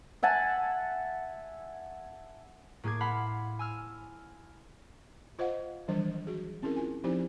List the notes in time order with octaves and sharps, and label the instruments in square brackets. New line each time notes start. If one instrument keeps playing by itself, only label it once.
[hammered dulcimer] E5 F#5 G#5 A5
[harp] A2 A#3 G#4 D6 G#6
F5 F#5 A5 B5 C6 F6
G#5 E6 F6
[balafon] F4 C5 D#5 F5 F#5
D#3 E3 F#3 G3 D4 C5
F#4 G#4
C4 C#4 E4 G#4 A#4
F4 G#5
F3 C4 D#4 E4 G4 C5